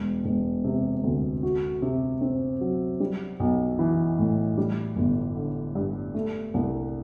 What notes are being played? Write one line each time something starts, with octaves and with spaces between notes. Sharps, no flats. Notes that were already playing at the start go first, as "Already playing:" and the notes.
Already playing: E1
E1
C3
D2
F#4
C3
C4
F#3
G3
B1
E3
A2
G3
G1
D3
G2
A3
C2